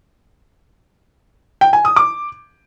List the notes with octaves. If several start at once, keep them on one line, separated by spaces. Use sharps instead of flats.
G5
G#5
D#6
D6